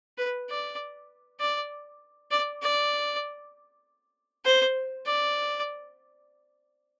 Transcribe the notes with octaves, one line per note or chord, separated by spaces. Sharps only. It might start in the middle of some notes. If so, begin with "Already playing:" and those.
B4
D5
D5
D5
D5
C5
D5